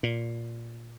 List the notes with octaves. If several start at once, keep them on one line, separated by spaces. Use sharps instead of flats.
A#2